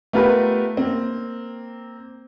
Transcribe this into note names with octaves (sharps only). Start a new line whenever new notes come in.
A3 B3 F4 G4 A#4 B4
A#3 C4